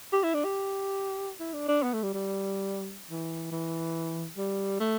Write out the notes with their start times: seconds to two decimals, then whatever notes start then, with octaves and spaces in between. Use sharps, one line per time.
0.13 G4
0.23 E4
0.34 D4
0.44 G4
1.40 E4
1.53 D4
1.68 D4
1.83 B3
1.93 A3
2.03 G3
2.14 G3
3.10 E3
3.52 E3
4.37 G3
4.80 A3